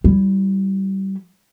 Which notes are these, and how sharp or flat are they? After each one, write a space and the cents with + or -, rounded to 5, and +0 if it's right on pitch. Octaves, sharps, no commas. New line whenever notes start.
G3 -20 E4 +0